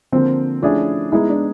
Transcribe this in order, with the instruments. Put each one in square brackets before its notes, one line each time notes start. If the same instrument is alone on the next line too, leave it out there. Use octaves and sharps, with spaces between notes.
[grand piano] D3 F3 A#3 [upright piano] C4
[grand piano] F3 A3 C#4 E4 G#4 [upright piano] D4
[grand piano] G#3 B3 D#4 G#4 [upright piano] E4
[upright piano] D4